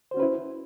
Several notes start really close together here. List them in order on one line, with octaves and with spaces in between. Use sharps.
C5 F#4 C#4 B4 E4